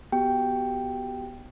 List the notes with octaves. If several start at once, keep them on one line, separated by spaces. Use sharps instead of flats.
B3 F#4 G4 G5